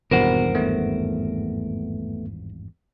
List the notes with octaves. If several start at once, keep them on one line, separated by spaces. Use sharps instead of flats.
G#1 E2 G2 B2 A#4 C5 F#5
A3 B3